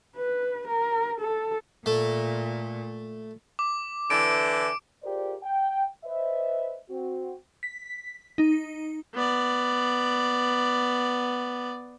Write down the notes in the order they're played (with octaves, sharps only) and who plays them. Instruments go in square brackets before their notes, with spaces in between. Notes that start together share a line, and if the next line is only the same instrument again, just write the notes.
[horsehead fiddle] B4
A#4
A4
[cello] A#2 [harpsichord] A3
[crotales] D6
[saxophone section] D3 E3 [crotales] D7
[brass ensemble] F4 G4 G#4 A#4 C5 D5
G5
B4 C5 D#5 E5
C4 F#4
[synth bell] B6
D#4
[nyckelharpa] B3 D5